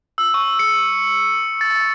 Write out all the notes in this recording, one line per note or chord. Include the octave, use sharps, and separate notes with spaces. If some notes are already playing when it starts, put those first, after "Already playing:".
E6
C#6
C#7
A6